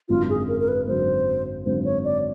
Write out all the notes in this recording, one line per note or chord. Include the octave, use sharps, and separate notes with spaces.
G#1 F#2 D3 F#3 F4
G#4
A#4
A#4
B4
G#1 F#2 D3 F#3 C5
G#1 F#2 D3 F#3 C5
C#5
D5